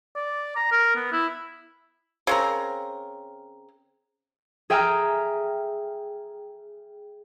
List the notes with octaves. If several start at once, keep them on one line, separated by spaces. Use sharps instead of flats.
D5
A#5
A#4
B3
E4
C#3 C4 A#4
G#4 E5 G5 G#5 A#5 F6